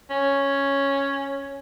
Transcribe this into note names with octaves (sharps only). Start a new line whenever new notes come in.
C#4